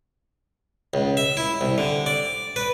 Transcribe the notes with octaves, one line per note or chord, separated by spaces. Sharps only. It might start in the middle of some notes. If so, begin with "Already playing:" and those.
C#2
E5
E4
C2
D3
D5
B4